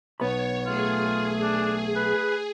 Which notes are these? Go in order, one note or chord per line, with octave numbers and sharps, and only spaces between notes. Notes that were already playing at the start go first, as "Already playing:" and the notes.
B1 B3 C#5 B5
A3 F4 G#4
D4
B4